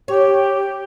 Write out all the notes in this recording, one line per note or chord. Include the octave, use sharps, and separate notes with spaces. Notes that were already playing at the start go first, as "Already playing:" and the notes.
G4 C#5